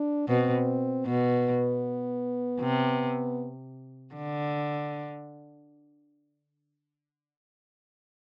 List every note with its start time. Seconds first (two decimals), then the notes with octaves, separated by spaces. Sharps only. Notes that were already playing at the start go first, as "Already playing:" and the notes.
Already playing: D4
0.28 B2 C4
1.05 B2 B3
2.60 C3
4.15 D3